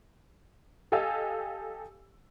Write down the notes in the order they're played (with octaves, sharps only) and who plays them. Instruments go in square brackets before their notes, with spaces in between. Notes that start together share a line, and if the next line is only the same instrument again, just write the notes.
[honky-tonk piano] G4 A4 D#5 F5 G#5 E6